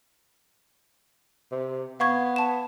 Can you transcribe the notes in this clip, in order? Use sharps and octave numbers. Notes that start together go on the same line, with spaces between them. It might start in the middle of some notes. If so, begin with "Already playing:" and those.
C3
B3 F5 C#6 G#6
A5 E7